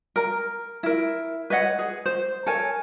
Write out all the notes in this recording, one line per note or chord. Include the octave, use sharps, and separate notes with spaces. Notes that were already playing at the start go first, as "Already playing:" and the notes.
A#4 A#5
E4 A#4
B4 C#5 D#5 F#5
G#4
C5
A4 A#4 C#5 G#5